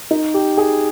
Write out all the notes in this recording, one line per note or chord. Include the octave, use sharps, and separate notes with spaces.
D#4
G4
G#4